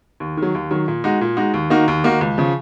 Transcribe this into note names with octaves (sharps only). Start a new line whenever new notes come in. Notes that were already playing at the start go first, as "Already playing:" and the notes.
D#2
D#3
F#3
D#2
D#3 F#3
A#2
G#3 D#4 F#4
A#2
G#3 D#4 F#4
D#2
D#3 A#3 D#4 F#4
D#2
D#3 A#3 D#4 F#4
C#2
C#3 F3